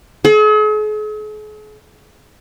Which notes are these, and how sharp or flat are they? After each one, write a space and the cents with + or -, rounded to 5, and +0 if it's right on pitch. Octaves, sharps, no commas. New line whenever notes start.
G#4 +45